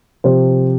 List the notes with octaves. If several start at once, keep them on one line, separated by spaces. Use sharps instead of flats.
C3 F3 C5